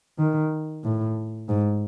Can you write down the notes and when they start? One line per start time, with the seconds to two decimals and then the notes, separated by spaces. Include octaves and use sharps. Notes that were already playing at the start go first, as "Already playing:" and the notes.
0.18 D#3
0.84 A2
1.49 G#2